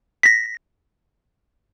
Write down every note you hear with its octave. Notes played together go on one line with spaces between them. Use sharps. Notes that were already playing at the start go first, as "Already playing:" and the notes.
A#6 B6